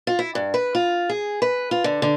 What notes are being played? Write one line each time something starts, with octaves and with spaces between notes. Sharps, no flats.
F4
E4
G2
B4
F4
G#4
B4
F4
D3
D3